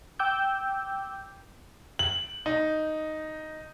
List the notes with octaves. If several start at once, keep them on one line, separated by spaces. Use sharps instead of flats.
G5 D6 E6 G6
F#7
D#4